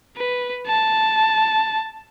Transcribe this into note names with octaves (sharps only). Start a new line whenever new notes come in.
B4
A5